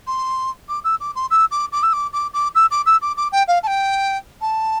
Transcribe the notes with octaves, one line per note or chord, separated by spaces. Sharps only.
C6
D6
E6
D6
C6
E6
D6
D6
E6
D6
D6
D6
E6
D6
E6
D6
D6
G5
F5
A5
G5
A5